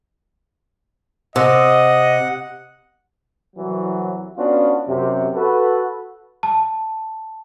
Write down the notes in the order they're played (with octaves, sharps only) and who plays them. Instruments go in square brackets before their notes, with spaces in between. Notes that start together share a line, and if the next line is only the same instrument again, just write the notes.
[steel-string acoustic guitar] C3 [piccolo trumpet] D#5 [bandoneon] F#5
[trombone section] C2 E3 F#3
B3 C#4 D4 F4 F#4
F#2 C3
F#4 A4 B4
[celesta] A5